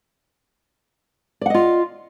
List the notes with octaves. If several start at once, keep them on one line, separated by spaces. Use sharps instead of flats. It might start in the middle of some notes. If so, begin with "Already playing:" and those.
F4 D5 D#5 F#5